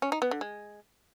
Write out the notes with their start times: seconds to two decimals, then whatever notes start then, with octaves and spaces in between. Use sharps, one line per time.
0.02 C#4
0.12 D#4
0.22 B3
0.31 D3
0.41 G#3